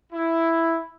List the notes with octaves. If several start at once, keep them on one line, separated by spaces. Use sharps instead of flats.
E4